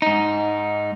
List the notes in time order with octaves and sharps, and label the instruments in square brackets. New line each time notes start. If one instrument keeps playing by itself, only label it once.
[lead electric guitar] G#2 D#4